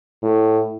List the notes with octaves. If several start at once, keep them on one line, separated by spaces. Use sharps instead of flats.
A2